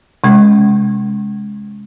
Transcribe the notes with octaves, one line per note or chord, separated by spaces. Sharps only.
C3 G#3 C#4